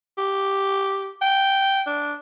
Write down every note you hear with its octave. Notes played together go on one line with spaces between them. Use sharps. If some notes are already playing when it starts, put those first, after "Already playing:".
G4
G5
D4